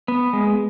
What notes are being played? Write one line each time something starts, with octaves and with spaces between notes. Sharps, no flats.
B3
G#3